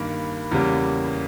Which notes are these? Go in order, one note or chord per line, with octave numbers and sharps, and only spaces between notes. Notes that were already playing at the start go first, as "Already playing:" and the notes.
Already playing: G2 D#3 A#3 B5
E2 C#3 G3 A#3